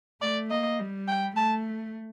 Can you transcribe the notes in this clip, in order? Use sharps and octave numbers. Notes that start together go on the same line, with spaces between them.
A3 D5
A#3 D#5
G3
G5
A3 A5